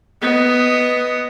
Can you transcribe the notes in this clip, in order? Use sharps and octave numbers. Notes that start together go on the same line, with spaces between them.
B3 D#5